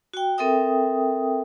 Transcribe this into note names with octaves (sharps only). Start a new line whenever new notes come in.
F#4 G5
C4 A4 A#4 E5 G5 D#6